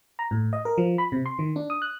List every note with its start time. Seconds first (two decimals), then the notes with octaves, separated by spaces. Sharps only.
0.19 A#5
0.31 A2
0.53 D#5
0.65 A#4
0.78 F3
0.98 B5
1.12 C3
1.26 C6
1.39 D#3
1.56 D4
1.70 D#6
1.82 F#6